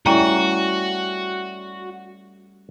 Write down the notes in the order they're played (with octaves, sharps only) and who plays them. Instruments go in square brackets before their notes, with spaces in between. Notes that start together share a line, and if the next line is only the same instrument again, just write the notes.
[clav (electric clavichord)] G3 A3 C#4 [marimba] E4 G5 A#5 [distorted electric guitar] F#4